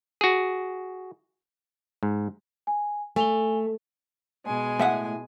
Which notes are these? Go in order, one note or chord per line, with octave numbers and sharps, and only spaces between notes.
F#4 G#4
G#2
G#5
A3 G#5 F7 G7
B2 G#3 G#5
A2 E5 F#5